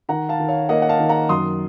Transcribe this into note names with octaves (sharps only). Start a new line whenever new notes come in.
D#3 F#5 A#5
F5 A5
D#3
C#5 F5
A#3 D#5 F#5
F#5
F5 A5
D#3
F#5 A#5
F#2 C6 D#6